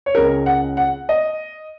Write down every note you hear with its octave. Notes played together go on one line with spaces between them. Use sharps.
C#5
C#2 C#3 G#3 A#4
F#5
F#5
D#5